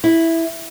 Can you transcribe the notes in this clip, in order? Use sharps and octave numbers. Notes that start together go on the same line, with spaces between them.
E4